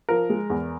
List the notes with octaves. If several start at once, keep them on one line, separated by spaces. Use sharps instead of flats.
F3 A#4
G#3
E2